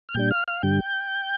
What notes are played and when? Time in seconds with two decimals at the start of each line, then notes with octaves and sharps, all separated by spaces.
0.09 F6
0.14 A#2 G3 D4 G5 G6
0.31 F5 F6
0.48 F5 F6
0.63 G2 D3 G3 G5 G6